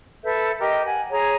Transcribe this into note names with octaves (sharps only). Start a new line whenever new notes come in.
A4 B4 E5 G6
G4 A#4 D#5
F#5 G#5
G#4 C#5 A#5